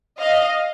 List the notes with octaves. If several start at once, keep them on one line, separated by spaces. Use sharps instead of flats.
D#5 F5